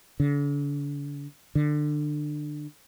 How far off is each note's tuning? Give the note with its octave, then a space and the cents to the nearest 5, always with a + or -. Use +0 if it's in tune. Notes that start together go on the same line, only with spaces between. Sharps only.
D3 -40
D3 +25